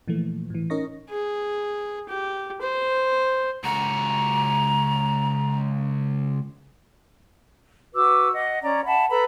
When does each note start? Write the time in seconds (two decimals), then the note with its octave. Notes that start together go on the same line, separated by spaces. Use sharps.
0.08 A#2 E3 F3 A3
0.50 A2 E3
0.70 C#4 D#4 A#4 D#5 C#6 A#6
1.10 G#4
2.09 G4
2.62 C5
3.64 C#2 F#4 A#5
7.94 F#4 B4 D6 E6
8.33 D#5 F#5
8.63 C#4 D5 A#5
8.85 E5 F#5 A5 B5
9.10 A4 B4 A#5 B5